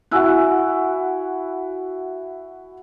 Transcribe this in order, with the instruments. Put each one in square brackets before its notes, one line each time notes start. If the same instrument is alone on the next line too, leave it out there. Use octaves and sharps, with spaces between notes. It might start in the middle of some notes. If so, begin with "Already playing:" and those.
[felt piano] E4 F#4 F#5 [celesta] G#5 E6 F#6